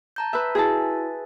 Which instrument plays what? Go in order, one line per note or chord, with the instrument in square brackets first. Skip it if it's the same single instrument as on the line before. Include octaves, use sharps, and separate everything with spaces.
[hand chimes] A5 A#5 G6
[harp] B4 E5
[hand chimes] E4 F#4 [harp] G#4 E5 A5